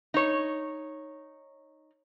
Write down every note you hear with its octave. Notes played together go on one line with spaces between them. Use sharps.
D#4 C#5